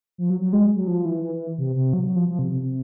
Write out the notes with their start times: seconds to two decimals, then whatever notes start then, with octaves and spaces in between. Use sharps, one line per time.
0.18 F3
0.30 F#3
0.41 F#3
0.53 G#3
0.76 F#3
0.88 F3
1.05 E3
1.23 E3
1.34 E3
1.58 C3
1.75 C3
1.93 F#3
2.04 F#3
2.16 F3
2.28 F3
2.39 C3
2.51 C3
2.62 C3